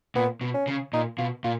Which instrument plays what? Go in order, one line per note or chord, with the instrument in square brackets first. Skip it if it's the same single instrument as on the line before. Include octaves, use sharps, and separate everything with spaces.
[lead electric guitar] A#2 [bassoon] B3
[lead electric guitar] B2
[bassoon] C#4
[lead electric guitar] C#3
[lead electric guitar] A#2 [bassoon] D#4
[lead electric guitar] B2 [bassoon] F4
[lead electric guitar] A#2 [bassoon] F4